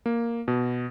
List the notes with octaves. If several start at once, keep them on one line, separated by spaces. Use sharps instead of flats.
A#3
B2